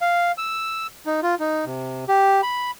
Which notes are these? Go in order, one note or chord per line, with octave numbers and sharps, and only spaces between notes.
F5
E6
D#4
F4
D#4
C3
G4
B5